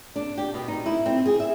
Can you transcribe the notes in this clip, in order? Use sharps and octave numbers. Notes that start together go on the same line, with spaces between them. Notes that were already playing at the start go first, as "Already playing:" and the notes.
D4
G4
B2
D#4
E4
C4
G#4
E5